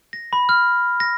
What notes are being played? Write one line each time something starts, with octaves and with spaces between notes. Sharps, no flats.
A#6
B5
F6
A#6